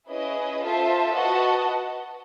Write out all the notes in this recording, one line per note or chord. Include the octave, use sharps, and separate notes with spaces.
C#4 E4 G#4 B4 D#5
F4 A4 C5 E5 A5
F#4 B4 D#5 F#5 A5